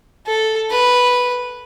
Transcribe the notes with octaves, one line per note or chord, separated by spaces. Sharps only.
A4
B4